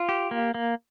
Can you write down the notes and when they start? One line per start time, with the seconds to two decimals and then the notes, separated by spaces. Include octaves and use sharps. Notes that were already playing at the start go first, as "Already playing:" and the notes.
Already playing: F4
0.09 G4
0.31 A#3
0.54 A#3